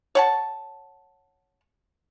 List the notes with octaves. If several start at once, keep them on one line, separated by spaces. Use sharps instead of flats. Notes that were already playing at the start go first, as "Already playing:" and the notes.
C#5 F#5 A5